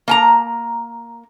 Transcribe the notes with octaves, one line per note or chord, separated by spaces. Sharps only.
A#3 G#5 A#5